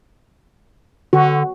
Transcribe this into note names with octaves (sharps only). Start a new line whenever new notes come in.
D3 F#4